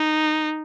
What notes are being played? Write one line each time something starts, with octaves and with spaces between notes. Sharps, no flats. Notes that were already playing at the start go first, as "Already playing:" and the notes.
Already playing: D#4